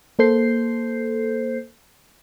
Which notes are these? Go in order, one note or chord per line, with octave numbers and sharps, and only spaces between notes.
A#3 A4 C5 G6 C7